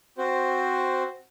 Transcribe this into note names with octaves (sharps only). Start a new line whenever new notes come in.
C4 F#4 C5